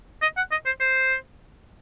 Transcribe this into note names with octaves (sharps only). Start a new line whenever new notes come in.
D#5
F#5
D#5
C5
C5